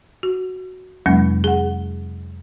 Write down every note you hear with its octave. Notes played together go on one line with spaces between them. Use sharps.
F#4
F2 C3 F#3 G#3 A#3 C#4
G#4 F#5